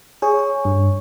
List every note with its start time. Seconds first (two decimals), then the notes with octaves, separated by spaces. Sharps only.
0.22 G#4 C#5 C#6
0.65 G2